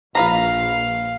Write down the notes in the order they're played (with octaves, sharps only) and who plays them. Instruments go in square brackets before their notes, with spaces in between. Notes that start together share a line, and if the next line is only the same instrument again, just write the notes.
[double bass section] A#1 [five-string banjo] F4 B4 A#5 [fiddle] F5